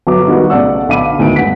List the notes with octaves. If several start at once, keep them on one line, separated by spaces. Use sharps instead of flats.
G1 F#3 E5 D6
D#3 G3 B3 F#4
B1 C#3 A3 D5 F#5 E6
B1 D3 F5 B5 D6 D#7
G1 D2 D#3 D7
G2 F#5 B6